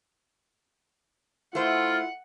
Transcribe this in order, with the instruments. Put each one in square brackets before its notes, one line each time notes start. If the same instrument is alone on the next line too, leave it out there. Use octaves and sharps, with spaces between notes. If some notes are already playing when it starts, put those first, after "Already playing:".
[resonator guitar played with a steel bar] A3 C5 [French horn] E4 [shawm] F4 [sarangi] F#5